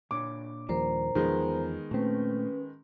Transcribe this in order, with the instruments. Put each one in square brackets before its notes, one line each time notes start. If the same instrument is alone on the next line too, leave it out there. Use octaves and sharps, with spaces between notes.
[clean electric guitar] A#2 D4 C#5 [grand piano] D6
[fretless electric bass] D#2 F3 G3 [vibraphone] A#4 C5 A#5
[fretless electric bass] E2 F3 [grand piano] D#3 G#3 B3
[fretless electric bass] A#2 C4 [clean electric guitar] A3 [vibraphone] C#4 B4